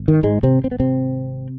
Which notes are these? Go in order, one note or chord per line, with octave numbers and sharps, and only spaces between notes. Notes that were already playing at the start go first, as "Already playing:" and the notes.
Already playing: G#1
D#3
G#2 G#3
C3 C4
C4
B3
C3 C4